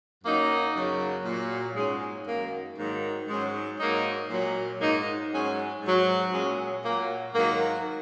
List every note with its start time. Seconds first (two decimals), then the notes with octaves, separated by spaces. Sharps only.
0.24 F#2 F#3 A#3 D#4
0.74 F#2 C#3 F#3
1.25 A#2 F#3
1.76 G#2 F#3 G#3 C#4
2.27 F#2 D#3 F#3 A#3
2.77 G#2 D#3 F#3 A#3
3.28 G#2 F#3 G#3 C#4
3.78 G#2 F#3 A#3 D#4
4.30 A#2 F#3
4.80 G#2 F#3 A#3 D#4
5.31 G#2 F#3 G#3 C#4
5.82 G#2 F#3
6.32 A#2 F#3 G#3 C#4
6.83 A#2 F#3 A#3
7.34 G#2 D#3 F#3 A#3